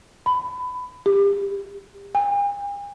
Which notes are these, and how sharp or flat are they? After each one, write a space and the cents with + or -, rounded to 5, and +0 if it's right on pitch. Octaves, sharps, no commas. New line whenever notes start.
B5 +20
G4 +30
G#5 -45